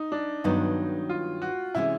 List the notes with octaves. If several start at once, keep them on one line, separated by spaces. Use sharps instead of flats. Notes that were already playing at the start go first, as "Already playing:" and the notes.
Already playing: D#4
D4
G2 D#3 F#3 B3 D4 D#4
F4
F#4
C3 E3 G#3 C#4 E4